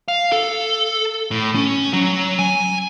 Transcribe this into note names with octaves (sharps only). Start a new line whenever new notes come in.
F5
A4
A2
C#4
F#3
G#5